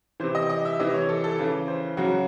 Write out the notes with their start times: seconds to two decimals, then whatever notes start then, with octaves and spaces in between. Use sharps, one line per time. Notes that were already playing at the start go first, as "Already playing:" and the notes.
0.20 C3 E3 C5
0.35 D#5
0.49 D#5
0.65 E5
0.79 C3 E3 D#5
0.94 C#5
1.09 A4
1.24 A4
1.39 C#3 E3
1.68 C5
1.97 C#3 F#3 F#4